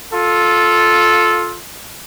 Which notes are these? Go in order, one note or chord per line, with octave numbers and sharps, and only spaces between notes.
F4 A4